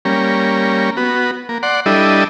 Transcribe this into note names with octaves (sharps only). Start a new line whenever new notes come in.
G3 A#3 C#4
B3 F#4
A#3
D5 F#5 C6
G3 D4 E4 A4 D#5